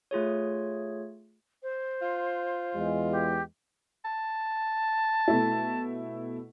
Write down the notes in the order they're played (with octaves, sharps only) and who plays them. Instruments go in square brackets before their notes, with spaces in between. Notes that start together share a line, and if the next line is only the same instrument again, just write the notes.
[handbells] A3 F4 G#4 C#5
[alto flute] C5
[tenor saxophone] F4
[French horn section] E2 G#3
[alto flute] G4
[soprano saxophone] A5
[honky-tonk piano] B2 A3 E4